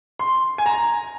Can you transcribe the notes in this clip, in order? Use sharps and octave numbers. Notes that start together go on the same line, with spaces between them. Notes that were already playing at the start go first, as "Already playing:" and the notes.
C6
G#5
A#5